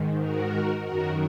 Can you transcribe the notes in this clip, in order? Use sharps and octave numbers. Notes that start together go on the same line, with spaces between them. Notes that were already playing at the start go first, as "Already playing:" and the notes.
Already playing: G#2 D#3
F#4 A#4
F#2 D#3 F#4 A#4